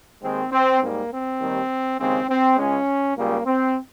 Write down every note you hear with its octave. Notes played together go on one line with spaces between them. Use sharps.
D#2 D#3 G#3 C4
C4
G#2 G3 A#3
C4
D#2 D#3 G3
D#2 C#3 G#3 C4
C4
C#2 C#3 G#3 C#4
C#2 C#3 G3 A#3
C4